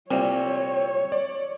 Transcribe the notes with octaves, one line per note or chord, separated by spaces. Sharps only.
C2 A#2 C4 C#5
D5